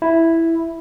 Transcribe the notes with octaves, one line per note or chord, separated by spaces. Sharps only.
E4